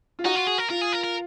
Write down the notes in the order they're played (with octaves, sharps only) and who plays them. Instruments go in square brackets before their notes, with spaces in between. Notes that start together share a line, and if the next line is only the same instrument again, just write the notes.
[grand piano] F4
[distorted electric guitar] D#4 [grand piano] F#4
[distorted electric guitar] F4
G#4
A#4
[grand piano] F4 [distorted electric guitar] A#4
[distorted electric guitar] G#4
A#4
A#4